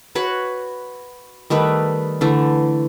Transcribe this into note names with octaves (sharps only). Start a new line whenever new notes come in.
F#4 B4 C#5 F#5
D#3 G3 A3 B4
D3 E3 A3